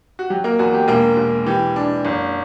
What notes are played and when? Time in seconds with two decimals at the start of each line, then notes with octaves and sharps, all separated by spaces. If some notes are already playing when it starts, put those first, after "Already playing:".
0.19 F#4
0.30 F#3 G4
0.44 A#3 A#4
0.59 E2 F#4
0.74 G4
0.88 E1 A#3 A#4
1.17 E1
1.46 E3 G4
1.76 D4
2.05 F#1